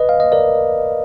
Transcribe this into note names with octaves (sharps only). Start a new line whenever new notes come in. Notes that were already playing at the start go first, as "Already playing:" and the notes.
Already playing: B4 D#5
F5
D#5
A#4 D5